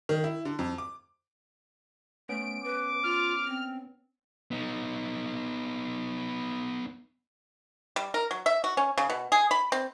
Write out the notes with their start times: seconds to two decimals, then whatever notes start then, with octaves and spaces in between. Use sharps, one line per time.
0.09 D#3
0.24 E4
0.45 D3
0.59 F2
0.78 D6
2.29 A3 B3 C#4 D7
2.64 B4 D6
3.04 F4 F6
3.47 C4
4.51 B3 D#4
7.96 G3
8.14 A#4
8.31 F#3
8.46 E5
8.64 F#4
8.77 C#4
8.98 C#3
9.10 B2
9.32 G#4
9.51 B5
9.72 C4